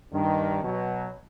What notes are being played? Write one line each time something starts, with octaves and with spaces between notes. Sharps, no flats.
G2 D#3
B2 F#3